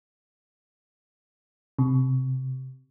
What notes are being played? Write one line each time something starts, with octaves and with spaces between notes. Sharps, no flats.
C3